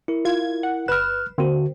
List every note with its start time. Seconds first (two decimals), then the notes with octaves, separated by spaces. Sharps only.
0.08 E4 A#4
0.25 F4 G#6
0.63 F#5
0.88 G1 B4 F6 F#6 E7
1.38 D3 A#3 C4 F#4